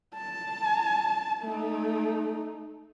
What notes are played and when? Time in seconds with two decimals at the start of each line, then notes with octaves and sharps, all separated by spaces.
0.15 A5
1.42 A3 D#4